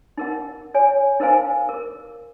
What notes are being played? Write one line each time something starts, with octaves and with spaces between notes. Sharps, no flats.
D#4 A#4 F#5
C#5 G#5
D#4 A#4 C5 F5 G#5
A#4